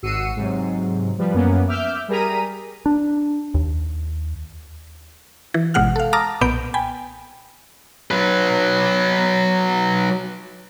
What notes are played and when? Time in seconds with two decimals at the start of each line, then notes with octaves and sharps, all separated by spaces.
0.02 G#1 F#4 E6 C7 C#7 D#7
0.36 G#2 C3 F#3
1.18 F3 G3 B4
1.34 F#2 A#3 B3 C#4
1.68 E5 D6 E6 F6 G6
2.08 G3 G#4 A#4 A#5 B6 D#7
2.86 D4
3.54 D#2
5.54 E3
5.74 G#1 B2 G#3 F#5 F6
5.96 A4 F5
6.13 A5 A#5 D6 D#6 F6 A#6
6.41 B1 A#2 B3 B5 G6 D7
6.74 G5 G#5 B5
8.11 F#3 B4